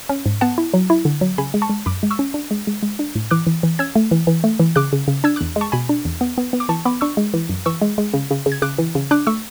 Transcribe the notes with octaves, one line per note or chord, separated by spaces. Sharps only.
C#4
G#2
B3 F#5 A5
E4
F#3
E4
D3
F#3
C#3 G#5 B5
G#3
A5 C#6
G#3
F#2 B5 D6
G#3
C#6 E6
C#4
D4
G#3
G#3
G#3
D4
A2
E3 D6 F#6
E3
E3
C#4 E6 G#6
A3
E3
E3
A3
E3
C#3 D6 F#6
C#3
C#3
D4 E6 G#6
E2 D6 F#6
G#3
A5 C#6
B2 G#5 B5
D4
E2
B3
B3
B3
D6
E3 A5 C#6
B3 B5 D6
D4 C#6 E6
G#3
E3
F#2
E3 C#6 E6
G#3
G#3
C#3
C#3
C#3
G#6
C#3 D6 F#6
E3
C#3
D4 D6 F#6
A3 C#6 E6